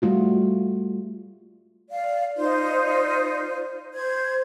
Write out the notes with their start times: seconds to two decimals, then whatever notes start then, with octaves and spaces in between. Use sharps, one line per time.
0.02 G3 A3 F4 F#4
1.90 D5 F5
2.37 D#4 F4 C5 D5
3.92 C5 G#6